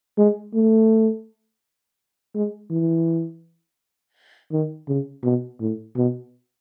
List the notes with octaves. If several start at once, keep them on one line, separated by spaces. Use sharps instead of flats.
G#3
A3
G#3
E3
D#3
C#3
B2
A2
B2